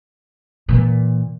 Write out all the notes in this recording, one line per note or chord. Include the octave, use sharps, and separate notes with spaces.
A#2 E3